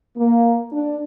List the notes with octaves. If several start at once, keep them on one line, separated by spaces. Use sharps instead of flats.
A#3
D4